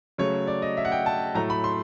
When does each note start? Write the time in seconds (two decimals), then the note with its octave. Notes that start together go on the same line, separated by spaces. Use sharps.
0.18 C#3 F#3 A3 C#5
0.47 D5
0.62 D#5
0.77 E5
0.85 F#5
0.92 G5
1.06 A5
1.34 A2 F#3 A3 A#5
1.50 B5
1.64 C6